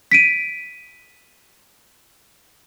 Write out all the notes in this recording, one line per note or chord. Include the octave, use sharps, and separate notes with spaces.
B6 D7 D#7